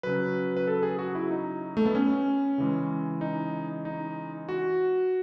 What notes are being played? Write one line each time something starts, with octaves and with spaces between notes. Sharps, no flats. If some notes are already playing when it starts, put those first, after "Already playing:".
C#3 F#3 B4
B4
A4
G#4
F#4
E4
D#4
A3
B3
C#4
C#3 E3 G#3
D#4
D#4
F#4